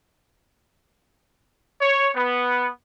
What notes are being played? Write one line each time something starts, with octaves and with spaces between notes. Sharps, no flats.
C#5
B3